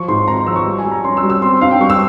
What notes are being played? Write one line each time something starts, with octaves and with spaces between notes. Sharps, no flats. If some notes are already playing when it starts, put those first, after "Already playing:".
Already playing: F3 C#6
G#2 C6
G#1 A#5
C6
F3 E6
C#6
G3
G#5
G3
A#5
C#4 C6
E6
G3
E6
C4 C6
G2 F5
G5
G3 C#6
E6